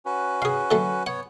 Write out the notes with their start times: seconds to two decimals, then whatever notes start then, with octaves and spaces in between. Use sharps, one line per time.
0.06 C#4 F#4 B4
0.42 G#4 F5
0.71 D3 F#3 A3
1.07 B3 C#5 F#5